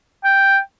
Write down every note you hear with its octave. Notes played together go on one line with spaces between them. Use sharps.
G5